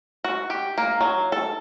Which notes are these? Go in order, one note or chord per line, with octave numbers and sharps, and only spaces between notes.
F#4
G4
A#3
F#3
A4